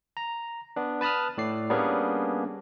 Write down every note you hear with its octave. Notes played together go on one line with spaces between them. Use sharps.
A#5
B3 D4
B4 A5 B5 D#6 F6
A2 D5 C7
G3 A#3 B3 C#4 D4 G#4